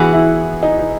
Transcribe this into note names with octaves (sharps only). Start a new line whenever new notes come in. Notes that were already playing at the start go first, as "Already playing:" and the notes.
Already playing: E3 B3 F#4 G#4
E4
D#4
D#4